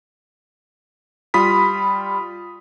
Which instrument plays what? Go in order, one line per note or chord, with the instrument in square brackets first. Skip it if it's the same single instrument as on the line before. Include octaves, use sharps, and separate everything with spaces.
[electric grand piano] G3 F4 B5 D#6 B6